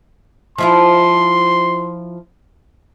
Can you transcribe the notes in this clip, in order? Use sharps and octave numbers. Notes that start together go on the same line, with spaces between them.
F3 E4 F4 C6